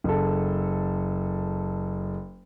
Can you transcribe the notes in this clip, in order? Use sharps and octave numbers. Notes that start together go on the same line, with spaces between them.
F#1 A4